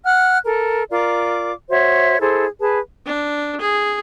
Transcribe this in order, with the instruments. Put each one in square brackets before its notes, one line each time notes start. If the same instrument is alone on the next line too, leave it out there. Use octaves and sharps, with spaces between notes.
[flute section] F#5 F6 F#6
A4 A#4
F4 A#4 D5 D6
F#4 C5 C#5 E5
E4 G#4 A4 C5
G#4 B4 A5
[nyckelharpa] D4
G#4